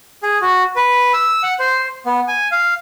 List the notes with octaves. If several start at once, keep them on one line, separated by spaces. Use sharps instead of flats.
G#4
F#4
B4
E6
F#5
C5
B3
G#5
F5